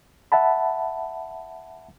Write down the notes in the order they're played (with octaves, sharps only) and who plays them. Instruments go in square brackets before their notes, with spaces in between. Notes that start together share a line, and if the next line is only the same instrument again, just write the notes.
[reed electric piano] E5 F#5 A5 B5